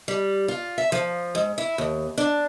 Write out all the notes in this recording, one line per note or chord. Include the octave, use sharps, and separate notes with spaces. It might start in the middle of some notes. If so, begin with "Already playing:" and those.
G3
F4
E5
F3
G#2
E4
D#2
D4